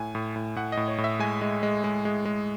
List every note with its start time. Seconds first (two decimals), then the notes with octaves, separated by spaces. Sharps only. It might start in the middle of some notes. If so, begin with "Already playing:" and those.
Already playing: A2 G#5
0.15 A2
0.36 A2
0.56 A2 F#5
0.72 A2 D#5
0.88 C#5
0.98 A2
1.04 E5
1.19 G#3 G#5
1.42 G#3
1.63 G#3
1.84 G#3
2.05 G#3
2.25 G#3